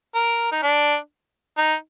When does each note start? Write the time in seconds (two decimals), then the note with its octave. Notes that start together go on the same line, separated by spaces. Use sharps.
0.15 A#4
0.52 D#4
0.63 D4
1.58 D#4